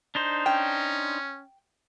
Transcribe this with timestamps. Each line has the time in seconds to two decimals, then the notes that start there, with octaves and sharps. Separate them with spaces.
0.15 D4 D#4 C5
0.46 C#4 G5